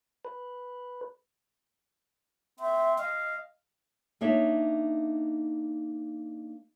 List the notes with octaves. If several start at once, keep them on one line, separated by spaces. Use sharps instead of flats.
B4
C4 E5
D#5 F5
A#3 D4 D#4 C#5 E5